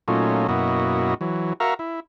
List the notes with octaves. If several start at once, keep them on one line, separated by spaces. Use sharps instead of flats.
A#2 F#3 A3 C#4 D#4 F4
F#2 B2 A#3 E4 F#4 D#5
E3 F#3
F#4 A#4 E5 F5 A#5 C#6
E4